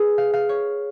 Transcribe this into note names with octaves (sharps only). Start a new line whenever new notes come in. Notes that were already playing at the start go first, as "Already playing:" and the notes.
Already playing: G#4 B4
F5
F5
C#5